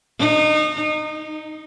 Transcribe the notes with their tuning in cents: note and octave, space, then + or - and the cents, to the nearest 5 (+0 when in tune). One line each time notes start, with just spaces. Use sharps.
D#4 -25
D#4 +5